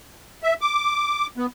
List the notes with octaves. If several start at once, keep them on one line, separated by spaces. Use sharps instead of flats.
E5
D6
B3